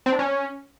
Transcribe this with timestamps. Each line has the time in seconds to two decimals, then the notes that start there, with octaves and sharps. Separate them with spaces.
0.06 C4
0.12 D4
0.19 C#4